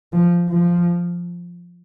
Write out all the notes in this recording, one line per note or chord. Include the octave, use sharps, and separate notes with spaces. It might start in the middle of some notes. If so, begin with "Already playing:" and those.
F3
F3